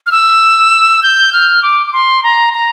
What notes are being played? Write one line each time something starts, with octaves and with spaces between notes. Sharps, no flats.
F6
E6
G6
F6
D6
D6
C6
A#5
A#5